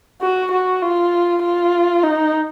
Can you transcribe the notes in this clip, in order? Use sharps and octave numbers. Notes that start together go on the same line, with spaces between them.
F#4
F#4
F4
F4
D#4